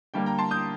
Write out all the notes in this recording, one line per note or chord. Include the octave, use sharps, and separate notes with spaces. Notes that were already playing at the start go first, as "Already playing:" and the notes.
D3 G3 A#3 G5
G5 A#5
A5 C6
D#6 G6